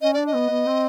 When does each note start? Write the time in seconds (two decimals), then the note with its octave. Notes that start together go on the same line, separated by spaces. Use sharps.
0.01 C#4 D#5
0.14 D4 D5
0.27 D#5
0.35 B3
0.50 B3
0.66 C4